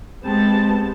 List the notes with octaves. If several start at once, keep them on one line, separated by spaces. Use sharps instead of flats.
G#3 B3 C4 G4 A5